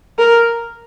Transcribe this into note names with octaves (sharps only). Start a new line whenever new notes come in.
A#4